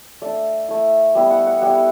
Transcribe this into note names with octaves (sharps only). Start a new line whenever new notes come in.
A3 D4 D5
A3 E4
G3 B3 E4
F#5
F#5
G3 B3 E4 F#5